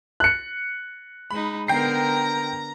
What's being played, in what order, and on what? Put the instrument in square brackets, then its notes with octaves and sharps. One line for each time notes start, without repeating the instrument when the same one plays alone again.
[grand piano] F#6 C#7
[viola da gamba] G#3 D#4 [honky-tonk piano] B5
[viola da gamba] D3 B3 A#4 [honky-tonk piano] G5 C7 [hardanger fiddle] A#5